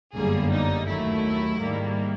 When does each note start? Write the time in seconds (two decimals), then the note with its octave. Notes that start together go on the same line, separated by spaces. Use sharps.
0.15 G1 F#2 D3 G3 A#3 G#4
0.51 D#4
0.88 D#2 D#3 F#3 A3 E4
1.59 G#2 D#3 G3 A#3